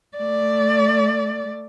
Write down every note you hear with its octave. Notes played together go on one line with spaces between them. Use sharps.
A3 D5